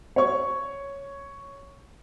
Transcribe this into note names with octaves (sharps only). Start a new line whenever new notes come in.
C#5 C#6